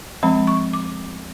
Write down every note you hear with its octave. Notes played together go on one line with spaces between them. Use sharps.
F3 G#3 C4 B5
C#6
D6